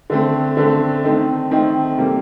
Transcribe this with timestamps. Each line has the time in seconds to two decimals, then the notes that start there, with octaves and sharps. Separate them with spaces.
0.10 D3 A3 C4
0.57 D3 A3 C4
1.04 D#3 A3 C4 D#4
1.51 D#3 A3 C4 D#4
1.98 C3 G3 A#3